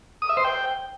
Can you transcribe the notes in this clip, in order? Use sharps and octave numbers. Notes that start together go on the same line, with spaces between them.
D#6
E5
C5
G5